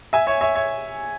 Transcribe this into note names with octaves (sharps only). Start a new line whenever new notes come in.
E5 G#5
C#5 E5
C#5 E5
C#5 E5